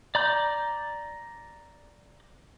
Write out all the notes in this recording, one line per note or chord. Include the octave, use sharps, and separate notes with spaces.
D5 A#5 G6